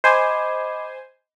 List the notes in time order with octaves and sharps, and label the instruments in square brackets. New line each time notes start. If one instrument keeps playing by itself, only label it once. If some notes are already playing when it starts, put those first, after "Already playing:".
[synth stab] C5 G#5 [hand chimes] D#5 B5 D6